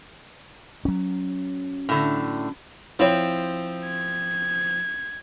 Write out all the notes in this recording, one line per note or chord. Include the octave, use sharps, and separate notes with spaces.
F#3 C#4
A2 D3
F3 C4 E4 C#5
G#6